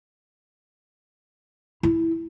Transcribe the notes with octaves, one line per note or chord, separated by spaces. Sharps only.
E4